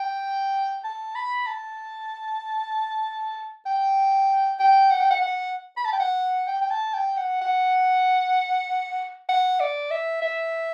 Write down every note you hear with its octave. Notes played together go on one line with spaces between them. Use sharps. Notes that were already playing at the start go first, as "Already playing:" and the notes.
Already playing: G5
A5
B5
A5
G5
G5
F#5
G5
F#5
F#5
B5
A5
G5
F#5
G5
G5
A5
G5
F#5
F#5
F#5
D5
E5
E5